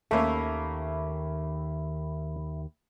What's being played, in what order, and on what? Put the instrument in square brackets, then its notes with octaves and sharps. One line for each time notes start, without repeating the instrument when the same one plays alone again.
[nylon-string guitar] D#2 D#3 [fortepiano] A3 A#3 C#4 [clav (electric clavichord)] A4 [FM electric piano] E5 B5